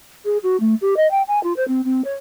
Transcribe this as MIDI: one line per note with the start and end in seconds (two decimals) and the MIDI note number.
0.25 0.38 68
0.43 0.56 66
0.60 0.74 57
0.81 0.94 67
0.96 1.09 75
1.10 1.22 79
1.28 1.41 80
1.43 1.53 65
1.56 1.66 72
1.68 1.84 60
1.84 2.01 60
2.04 2.13 73